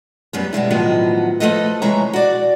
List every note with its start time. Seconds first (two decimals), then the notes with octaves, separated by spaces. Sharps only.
0.33 F#2 G3 B3
0.53 B2 G3 G#3 E4
0.70 A2 D#3 F3 F#3 B3 D#5
1.40 F3 G3 A3 A4 B4 D#5
1.82 C3 E3 G#3 C#5 E5 A#5
2.13 F#4 D5